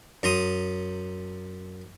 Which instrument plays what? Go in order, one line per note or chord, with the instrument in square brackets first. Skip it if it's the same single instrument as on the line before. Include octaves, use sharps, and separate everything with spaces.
[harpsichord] F#2 A#5 C6 D#6